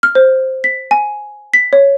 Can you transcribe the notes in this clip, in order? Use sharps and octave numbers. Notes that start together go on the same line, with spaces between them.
F6
C5
B6
G#5
B6
C#5